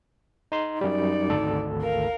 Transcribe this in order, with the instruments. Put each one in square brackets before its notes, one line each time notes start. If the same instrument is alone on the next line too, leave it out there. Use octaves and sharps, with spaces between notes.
[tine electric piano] D#4 C6
[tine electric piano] F#2 G3 [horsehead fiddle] D#4 D5
[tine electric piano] G#1 D2 A4
[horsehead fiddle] A#4 F5